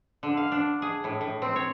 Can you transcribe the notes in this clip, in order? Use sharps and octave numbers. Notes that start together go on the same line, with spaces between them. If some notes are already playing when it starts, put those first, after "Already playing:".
D3
F5
D4
G#4
A2
A2
C4
C#5